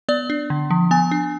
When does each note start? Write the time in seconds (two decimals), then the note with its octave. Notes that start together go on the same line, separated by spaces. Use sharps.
0.09 B3 D5
0.30 D4
0.50 D3
0.71 F3
0.91 B3 G#5
1.11 D4